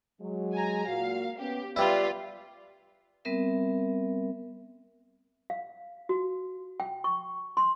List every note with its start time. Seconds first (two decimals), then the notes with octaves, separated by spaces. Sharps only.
0.20 F#3 G#3
0.53 G#5 A#5
0.86 A#2 F#4 F5
1.38 B3 C#4 G4
1.76 G3 E4 F4 B4 D5
3.25 G3 B3 C4 A#4 E5
5.50 F5
6.09 F#4
6.80 G5
7.04 C#6
7.57 C6